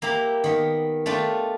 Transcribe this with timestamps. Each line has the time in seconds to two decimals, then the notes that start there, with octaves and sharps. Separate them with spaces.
0.02 A#3 E4 G4 A#5
0.44 D#3 B3
1.06 A3 D4 F4 G5